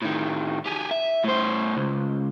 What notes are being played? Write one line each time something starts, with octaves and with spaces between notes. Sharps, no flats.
A2 D#3
G4 G#4
E5
A2 C5
C#2